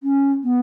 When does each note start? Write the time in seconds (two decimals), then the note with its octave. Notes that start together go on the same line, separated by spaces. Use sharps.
0.03 C#4
0.44 B3